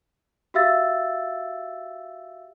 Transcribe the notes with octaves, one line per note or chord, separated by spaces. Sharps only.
F#4 G4 E5 F5 E6 A6